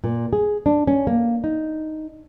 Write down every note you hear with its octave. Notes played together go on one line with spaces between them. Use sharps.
A#2
G#4
D4
C#4
A#3
D#4